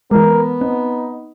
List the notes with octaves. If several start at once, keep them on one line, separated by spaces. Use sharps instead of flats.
E3 G#3 B3 A#4
C4 D#4